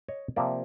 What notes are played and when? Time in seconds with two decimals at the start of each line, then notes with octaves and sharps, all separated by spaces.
0.08 C#5 D#5
0.36 C3 F3 A#3 D5 E5